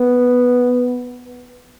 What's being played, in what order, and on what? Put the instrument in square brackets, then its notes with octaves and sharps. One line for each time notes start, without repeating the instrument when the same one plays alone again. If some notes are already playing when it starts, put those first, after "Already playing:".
Already playing: [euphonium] B3